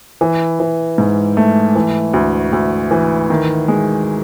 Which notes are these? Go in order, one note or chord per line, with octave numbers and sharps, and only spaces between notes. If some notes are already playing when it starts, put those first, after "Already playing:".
E3
E3
G#2
A3
E3
D2
D2
E3
D#3
G#3